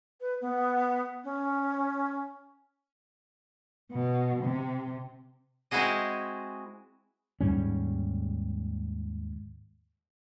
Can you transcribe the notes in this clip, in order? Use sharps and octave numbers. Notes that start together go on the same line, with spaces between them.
B4
B3
C#4
B2
C3
G#3 C4 E4 F#4 G#4 D#5
D#2 G#2 G3 C#4